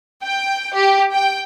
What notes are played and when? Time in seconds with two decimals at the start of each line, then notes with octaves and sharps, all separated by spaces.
0.21 G5
0.74 G4
1.12 G5